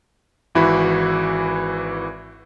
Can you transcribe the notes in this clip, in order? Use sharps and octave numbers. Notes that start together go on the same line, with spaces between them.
G#1 E3 E4 F#4 B5